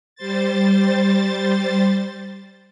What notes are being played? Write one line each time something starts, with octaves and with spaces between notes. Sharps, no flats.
G3 C5 A6